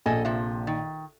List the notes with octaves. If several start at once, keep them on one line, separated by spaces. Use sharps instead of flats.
A#1 A4 D#5 G#5
C3 F3
D#3